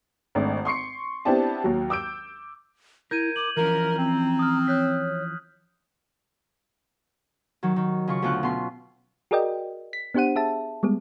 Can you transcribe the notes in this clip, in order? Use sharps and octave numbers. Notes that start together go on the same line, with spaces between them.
G#1 A3 D4
C6 C#6 C7 C#7
B3 C4 D4 E4 G4 A5
D#2 F#3
D6 E6 G6 D7
E4 A#4 G6 G#6 D#7
D6 F#7
E3 F3 C#4 A#4 A#5
C4
D#6 F6
C#5 F#6 G6 B6
D#3 F#3
D#3
C#3 F4 C#6
D2 B2 F4 G5 F#6
B2 C#4 C6
F#4 G#4 A#4 D5 D#5 G5
B6
B3 D4 G4 C5 F#5 D#7
G#4 E5 A5
G3 G#3 B3 G#4